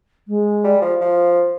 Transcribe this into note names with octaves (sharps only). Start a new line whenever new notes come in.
G#3
G3
F3 F5
F3